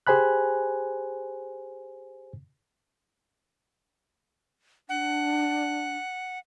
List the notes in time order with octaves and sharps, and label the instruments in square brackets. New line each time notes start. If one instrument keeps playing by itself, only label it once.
[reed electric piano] G4 G#4 C5 G#5 B5 F#6
[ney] D4 [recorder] F#5